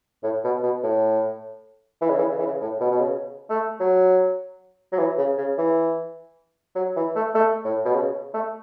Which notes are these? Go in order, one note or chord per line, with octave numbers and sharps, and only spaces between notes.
A2
B2
B2
A2
E3
C#3
E3
C#3
E3
C#3
A2
B2
B2
C#3
A3
F#3
F#3
E3
C#3
C#3
E3
F#3
E3
A3
A3
A2
B2
C#3
A3